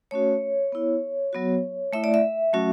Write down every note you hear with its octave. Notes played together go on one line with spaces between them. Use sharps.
A3 C#4 F#4 C#5
B3 E4
F#3 B3 F#4
A3 E4 E5
D5
E5
F#3 A3 C#4 F#4